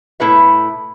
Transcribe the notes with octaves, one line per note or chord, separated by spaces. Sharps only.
A2 E4 A4 B4 E5